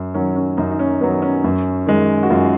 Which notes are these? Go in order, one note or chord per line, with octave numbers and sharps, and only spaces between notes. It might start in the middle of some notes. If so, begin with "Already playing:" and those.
Already playing: F#2
D#3 F#3 C#4
C#4
F#2 D#4
D#4
C#4
D#3 F#3 B3
C#4
F#2
D#3 G#3
F#4
F#2 F4